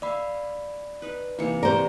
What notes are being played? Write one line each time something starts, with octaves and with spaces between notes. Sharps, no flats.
D5 E5 F5 B5
D#4 B4
C3 E3 A#3 D#4 C#7
G4 A#4 C5 D5